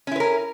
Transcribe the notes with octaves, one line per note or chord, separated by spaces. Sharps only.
C#4 E4 A#4 B4